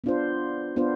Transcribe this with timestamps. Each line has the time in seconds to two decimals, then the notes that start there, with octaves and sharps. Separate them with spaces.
0.04 B3 D4 F4 C5
0.76 B3 D4 F4 C5